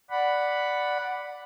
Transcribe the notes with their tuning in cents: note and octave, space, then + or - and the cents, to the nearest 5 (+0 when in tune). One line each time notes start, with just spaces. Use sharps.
D5 +0 F#5 +0 B5 +0